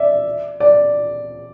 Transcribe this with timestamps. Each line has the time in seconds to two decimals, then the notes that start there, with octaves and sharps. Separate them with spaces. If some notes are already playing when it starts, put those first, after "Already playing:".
Already playing: D5 E5
0.60 D5